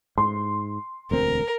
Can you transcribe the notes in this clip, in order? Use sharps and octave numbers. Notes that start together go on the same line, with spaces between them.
G#2 C6
E1 D2 C4 A#4